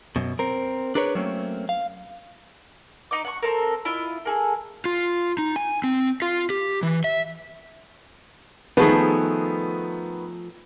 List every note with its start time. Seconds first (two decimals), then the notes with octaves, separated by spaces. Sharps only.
0.16 F#2 B2
0.39 C4 A#4
0.95 D4 G#4 A#4 B4 C#5
1.15 F#3 A3 A#3 C4 C#4
1.69 F5
3.11 D#4 D#5 D6
3.25 F#5 A5 C#6
3.42 C4 A4 A#4
3.85 E4 F4 D#5
4.25 A#3 G#4 A4
4.85 F4
5.38 D#4
5.56 G#5
5.84 C4
6.22 F4
6.50 G4
6.83 E3
7.04 E5
8.77 D#3 F3 A3 B3 G#4